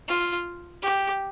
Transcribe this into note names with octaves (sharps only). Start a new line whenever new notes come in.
F4
G4